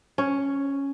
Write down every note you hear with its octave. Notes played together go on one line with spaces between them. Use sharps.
C#4